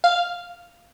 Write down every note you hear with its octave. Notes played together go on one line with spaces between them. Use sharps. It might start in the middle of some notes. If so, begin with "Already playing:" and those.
F5